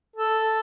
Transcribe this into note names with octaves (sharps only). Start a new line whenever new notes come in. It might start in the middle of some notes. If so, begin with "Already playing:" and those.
A4